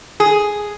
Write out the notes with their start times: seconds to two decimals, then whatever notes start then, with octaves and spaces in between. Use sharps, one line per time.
0.20 G#4